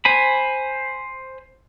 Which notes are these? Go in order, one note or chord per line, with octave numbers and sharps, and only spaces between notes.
C5 G#5 B5